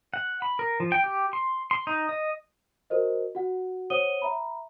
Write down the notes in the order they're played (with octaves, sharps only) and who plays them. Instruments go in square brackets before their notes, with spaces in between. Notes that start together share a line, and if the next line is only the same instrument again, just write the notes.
[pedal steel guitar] F#5
B5
A#4
F3
G5
G4
C6
C6
D#4
D#5
[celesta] F#4 A#4 C5 D#5
F#4 F#5
C5 C#5 F#5 D#6 D#7 G7
E5 A#5 B5